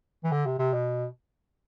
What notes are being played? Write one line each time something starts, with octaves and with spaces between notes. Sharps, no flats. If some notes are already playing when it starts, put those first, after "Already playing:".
E3
D3
C3
C3
B2